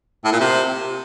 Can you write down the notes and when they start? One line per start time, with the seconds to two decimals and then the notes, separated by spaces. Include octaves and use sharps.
0.25 A2
0.33 A#2
0.40 C3